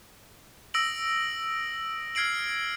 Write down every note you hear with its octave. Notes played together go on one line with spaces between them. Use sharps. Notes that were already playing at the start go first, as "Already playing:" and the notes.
D#6 E6 A#6 D7 F#7
F6 G#6 C7 D7 F#7